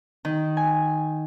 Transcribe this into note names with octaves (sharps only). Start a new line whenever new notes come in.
D#3
G#5